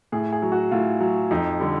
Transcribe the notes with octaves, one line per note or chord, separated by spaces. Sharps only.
A2 G#4
G#4
F#3
F#4
A2 F4
F#3
F2 D#4
D3 G3